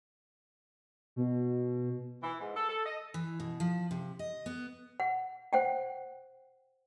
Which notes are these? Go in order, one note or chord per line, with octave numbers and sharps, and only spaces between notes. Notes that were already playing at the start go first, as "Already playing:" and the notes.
B2
E3
G#2
A4
A4
D#5
E3
B2
F3
C3
D#5
B3
F#5
C5 F#5 G5